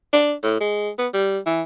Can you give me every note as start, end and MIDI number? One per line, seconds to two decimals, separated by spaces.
0.13 0.34 62
0.43 0.59 45
0.60 0.90 56
0.99 1.08 59
1.13 1.38 55
1.46 1.62 52